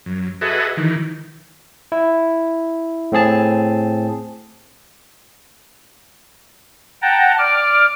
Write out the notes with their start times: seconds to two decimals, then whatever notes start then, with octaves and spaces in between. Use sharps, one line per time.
0.06 F#2
0.41 F#4 G#4 A4 B4 D#5 E5
0.77 D#3 E3
1.92 E4
3.12 A2 C4 G#4 A5
7.02 F#5 G5 A5 A#5
7.38 D5 D6 F6